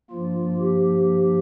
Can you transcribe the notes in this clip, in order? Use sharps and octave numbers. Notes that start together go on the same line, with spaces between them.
G2 F3 A#3 F4
G4